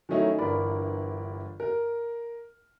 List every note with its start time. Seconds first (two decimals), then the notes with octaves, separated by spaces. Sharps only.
0.09 D#3 F#3 A3 C#4 D#4 E4
0.38 G1 E3 A#4 D5 B5
1.60 A#4